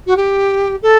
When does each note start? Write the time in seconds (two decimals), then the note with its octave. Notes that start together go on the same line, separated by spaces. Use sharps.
0.06 F#4
0.16 G4
0.82 A4